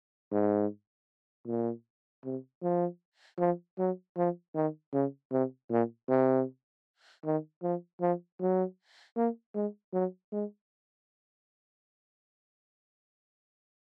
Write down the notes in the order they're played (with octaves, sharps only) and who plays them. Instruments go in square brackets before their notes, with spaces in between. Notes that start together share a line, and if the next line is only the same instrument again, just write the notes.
[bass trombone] G#2
A#2
C3
F3
F3
F#3
F3
D#3
C#3
C3
A#2
C3
D#3
F3
F3
F#3
A#3
G#3
F#3
G#3